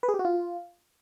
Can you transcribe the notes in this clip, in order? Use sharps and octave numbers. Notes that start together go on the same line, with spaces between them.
B4
G#4
G4
F#4
F4